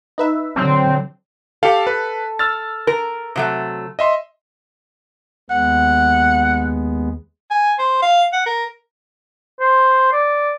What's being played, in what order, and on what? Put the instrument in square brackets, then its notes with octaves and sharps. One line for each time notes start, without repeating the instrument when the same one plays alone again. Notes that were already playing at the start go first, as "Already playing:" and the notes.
[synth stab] D#4 B4 E5
[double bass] D3 F#3 [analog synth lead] C4
[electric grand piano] G4 F5 [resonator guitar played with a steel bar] A4
[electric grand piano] B4
E6 F6 A6
[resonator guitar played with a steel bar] A#4
C3 F#3 A3
[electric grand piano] D#5 E5 C6
[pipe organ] D#2 G#3 B3 [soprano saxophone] F#5
[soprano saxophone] G#5
C5
F5
F#5
A#4
[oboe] C5
D5